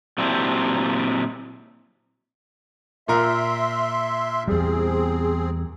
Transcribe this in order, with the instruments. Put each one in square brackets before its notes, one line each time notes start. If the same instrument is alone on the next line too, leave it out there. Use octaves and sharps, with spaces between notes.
[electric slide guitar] A#2 F#3 C4 D4 E4 G4
[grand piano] A#2 A#4 [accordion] E5 C6
[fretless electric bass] E2 G3 [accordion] C4 G#4